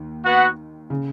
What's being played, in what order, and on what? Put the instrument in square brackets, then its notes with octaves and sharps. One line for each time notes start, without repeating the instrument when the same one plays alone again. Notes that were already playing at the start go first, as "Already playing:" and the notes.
Already playing: [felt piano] D#2 D#3
[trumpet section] B3 F#4 B4 F#5
[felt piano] C#3